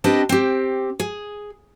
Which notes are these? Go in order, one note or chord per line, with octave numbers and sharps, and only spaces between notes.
C4 D4 G4 B4 D#5 A5
C4 G4
G#4